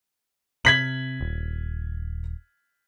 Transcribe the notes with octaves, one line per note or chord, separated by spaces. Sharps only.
C3 G#6 B6 F#7
D#1